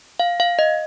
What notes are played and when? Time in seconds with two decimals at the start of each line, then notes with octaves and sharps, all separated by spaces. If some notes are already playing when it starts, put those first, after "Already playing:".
0.20 F5
0.40 F5
0.59 D#5